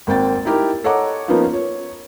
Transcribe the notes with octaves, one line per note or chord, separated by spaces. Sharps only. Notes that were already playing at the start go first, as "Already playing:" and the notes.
G#1 A#3 C4 G5 A6
D#4 E4 G4 A#4
A4 C#5 D#5 F#5 A#5 D6
F3 A#3 B3 C#4 D#4 F4
C#5